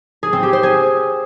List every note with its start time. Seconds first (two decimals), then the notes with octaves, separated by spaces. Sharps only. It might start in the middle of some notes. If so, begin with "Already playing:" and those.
0.23 G#4
0.33 C4
0.43 G4
0.53 C5
0.63 G#4